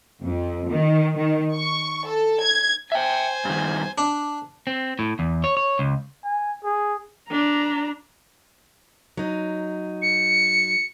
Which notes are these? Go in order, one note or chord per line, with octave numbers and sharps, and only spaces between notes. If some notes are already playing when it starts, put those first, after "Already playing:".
F2
D#3
D#3
C#6
A4
G#6
C5 E5 G5 G#5
G2 D#3
D4
C4
A2
E2
C#5
C#5
C#2
G#5
G#4
D4 A#5
F#3 D#4
C#7